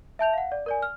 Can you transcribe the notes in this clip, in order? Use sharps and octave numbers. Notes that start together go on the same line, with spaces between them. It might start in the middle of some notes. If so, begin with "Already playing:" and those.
E5 A5 G6 F7
F5 F#5
D5
A#4 D5 G#5
F6